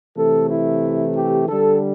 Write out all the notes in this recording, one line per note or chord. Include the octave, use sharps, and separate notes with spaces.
C3 E3 A3 A4
E4
G4
D3 G3 A4